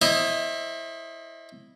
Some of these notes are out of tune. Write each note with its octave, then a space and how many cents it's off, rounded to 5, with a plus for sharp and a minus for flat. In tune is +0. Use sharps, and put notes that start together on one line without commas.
E4 +0 C5 +40 D#5 +0